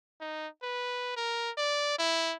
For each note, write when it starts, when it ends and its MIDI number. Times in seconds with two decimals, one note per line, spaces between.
0.21 0.48 63
0.63 1.13 71
1.16 1.51 70
1.58 1.98 74
1.99 2.35 64